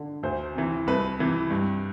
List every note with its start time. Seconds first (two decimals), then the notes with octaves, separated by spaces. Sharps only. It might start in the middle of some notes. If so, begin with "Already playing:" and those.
Already playing: D3
0.23 D2 C5
0.55 C3 E3
0.87 C2 B4
1.19 C3 E3
1.51 G2